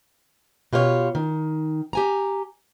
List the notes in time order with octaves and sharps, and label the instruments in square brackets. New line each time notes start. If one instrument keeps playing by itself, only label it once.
[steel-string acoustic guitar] B2 F4 G4 A#4 C#5
D#3
G4 G#5 A#5